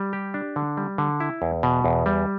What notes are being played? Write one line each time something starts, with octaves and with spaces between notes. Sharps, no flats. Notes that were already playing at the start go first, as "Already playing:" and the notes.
Already playing: G3
G4
D4
D3
G3
D3
E4
E2
B2
E2
G3